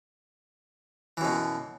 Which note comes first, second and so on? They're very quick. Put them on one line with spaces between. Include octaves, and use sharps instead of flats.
E3 F#2 B2